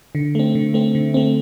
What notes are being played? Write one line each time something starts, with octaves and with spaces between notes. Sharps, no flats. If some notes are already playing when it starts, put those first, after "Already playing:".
D3
A3 C4
D3
A3 C4
D3
A3 C4